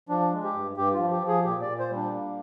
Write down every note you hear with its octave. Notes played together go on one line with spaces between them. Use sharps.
F3 D4
G#3
G4
G2
G2 G4
F4
F3
G4
F3
G#4
A#2 G4
D5
A#2
C5
G3
D4
A#3